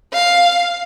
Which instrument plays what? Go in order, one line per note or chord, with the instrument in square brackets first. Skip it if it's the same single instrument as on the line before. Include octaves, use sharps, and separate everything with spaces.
[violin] F5